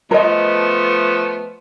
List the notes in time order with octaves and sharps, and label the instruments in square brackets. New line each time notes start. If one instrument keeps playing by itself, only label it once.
[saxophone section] F3 A3 B3 [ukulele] A#4 D#5